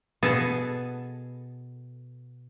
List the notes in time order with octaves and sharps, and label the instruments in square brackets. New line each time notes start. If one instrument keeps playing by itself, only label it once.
[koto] B2 B3 G#4 A4